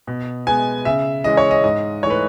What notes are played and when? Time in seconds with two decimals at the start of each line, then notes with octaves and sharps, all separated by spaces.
0.07 B2
0.47 G#3 B3 G#5
0.85 C#3 E5
1.24 E3 G#3 C#4 D#5
1.37 C#5
1.51 D#5
1.64 G#2 D#5
2.03 E3 C#5
2.07 A3 B4